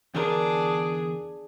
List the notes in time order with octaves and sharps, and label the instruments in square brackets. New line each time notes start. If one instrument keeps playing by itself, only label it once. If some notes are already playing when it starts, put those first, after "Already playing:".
[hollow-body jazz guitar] E2 D3 A#4 [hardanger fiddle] D4 [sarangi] G#4